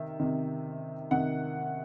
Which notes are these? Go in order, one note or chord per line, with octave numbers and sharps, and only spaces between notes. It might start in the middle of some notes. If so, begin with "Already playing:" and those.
Already playing: C3 D#3 E5
C3 D#3
C3 D#3 F#5